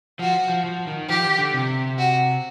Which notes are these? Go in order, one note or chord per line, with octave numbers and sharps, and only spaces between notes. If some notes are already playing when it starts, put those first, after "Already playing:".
F3 F#4
F3
F3
D#3
F3 G4
D3
C3
F#4